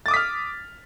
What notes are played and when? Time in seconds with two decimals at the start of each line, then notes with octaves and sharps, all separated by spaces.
0.06 A6
0.08 D6
0.11 D#6
0.14 B6
0.16 F6